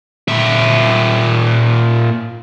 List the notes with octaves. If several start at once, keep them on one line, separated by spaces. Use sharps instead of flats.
A#2 E5